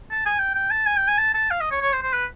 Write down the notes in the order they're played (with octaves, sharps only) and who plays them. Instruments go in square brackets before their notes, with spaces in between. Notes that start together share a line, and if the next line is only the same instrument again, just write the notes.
[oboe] A5
G#5
G5
G5
A5
G#5
G5
G#5
A5
A5
F5
D#5
C#5
C#5
C5
C5
B4